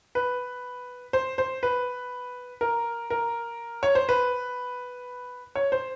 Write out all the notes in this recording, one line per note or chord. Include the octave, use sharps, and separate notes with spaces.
B4
C5
C5
B4
A#4
A#4
C#5
C5
B4
C#5
C5